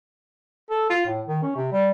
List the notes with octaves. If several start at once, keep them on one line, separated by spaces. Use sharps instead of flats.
A4
F4
A2
D#3
C#4
C3
G3